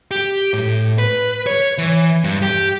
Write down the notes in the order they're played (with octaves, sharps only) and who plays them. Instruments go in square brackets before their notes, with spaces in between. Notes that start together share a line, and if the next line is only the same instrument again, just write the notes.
[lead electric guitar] G4
A2
B4
C#5
E3
G2
G4